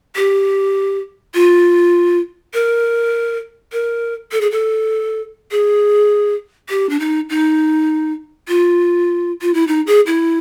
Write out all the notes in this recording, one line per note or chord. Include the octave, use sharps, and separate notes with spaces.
G4
F4
A#4
A#4
A4
G#4
A4
G#4
G4
D4
D#4
D#4
F4
F4
E4
D#4
G#4
E4